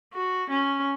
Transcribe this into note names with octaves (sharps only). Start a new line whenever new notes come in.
F#4
C#4